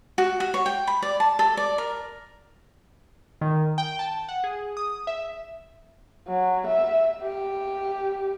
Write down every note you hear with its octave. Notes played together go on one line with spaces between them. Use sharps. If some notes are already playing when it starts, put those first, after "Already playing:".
F#4
F#4
C#5
G5
B5
D5
A5
A4
D5
A#4
D#3
G5
A5
F#5
G#4
D#6
E5
F#3
E5
G4